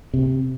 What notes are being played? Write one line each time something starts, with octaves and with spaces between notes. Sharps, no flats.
C3